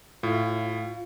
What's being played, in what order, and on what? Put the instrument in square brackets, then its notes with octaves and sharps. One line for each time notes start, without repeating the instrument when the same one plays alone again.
[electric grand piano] A2 [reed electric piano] F4 F5